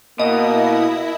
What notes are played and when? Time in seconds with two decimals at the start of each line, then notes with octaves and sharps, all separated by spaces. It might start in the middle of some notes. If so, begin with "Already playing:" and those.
0.20 B2 A#3 E4 D#5